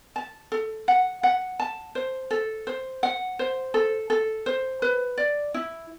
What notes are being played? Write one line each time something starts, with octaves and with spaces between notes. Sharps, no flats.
A5
A4
F#5
F#5
A5
C5
A4
C5
F#5
C5
A4
A4
C5
B4
D5
E4